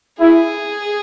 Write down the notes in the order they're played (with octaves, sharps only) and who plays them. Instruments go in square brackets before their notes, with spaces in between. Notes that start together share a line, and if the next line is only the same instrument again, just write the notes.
[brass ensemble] E4 [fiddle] G#4